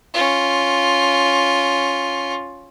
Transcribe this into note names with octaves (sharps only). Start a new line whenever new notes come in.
C#4 F4